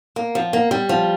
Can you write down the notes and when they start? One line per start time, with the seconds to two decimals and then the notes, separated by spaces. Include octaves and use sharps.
0.16 A#3
0.35 F3
0.53 A#3
0.71 G3
0.89 F3